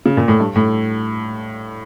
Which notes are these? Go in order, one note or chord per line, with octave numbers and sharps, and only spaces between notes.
C#3
A#2
A2
G2
A2